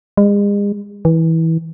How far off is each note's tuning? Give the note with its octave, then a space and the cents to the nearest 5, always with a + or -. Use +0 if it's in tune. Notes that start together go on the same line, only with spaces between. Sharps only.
G#3 -40
E3 -20